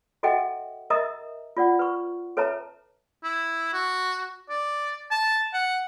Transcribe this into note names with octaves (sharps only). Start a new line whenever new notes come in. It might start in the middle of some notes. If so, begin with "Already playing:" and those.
F#4 A4 D#5 E5 F#5 G5
A#4 D#5 E5 A#5 D#6
F4 D5 F#5
B4 C#6
A4 B4 C#5 E5 A5 A#5
E4
F#4
D5
A5
F#5